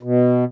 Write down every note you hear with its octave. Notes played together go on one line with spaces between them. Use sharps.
B2